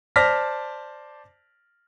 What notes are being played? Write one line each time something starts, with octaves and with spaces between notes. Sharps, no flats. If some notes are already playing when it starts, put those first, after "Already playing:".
C5 D5 A5 F6 A#6 B6